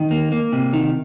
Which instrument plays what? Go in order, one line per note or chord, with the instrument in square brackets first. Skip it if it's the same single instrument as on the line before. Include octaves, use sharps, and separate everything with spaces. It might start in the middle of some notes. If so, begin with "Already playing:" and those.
Already playing: [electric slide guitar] D#3
A#3
A#3
C3
D#3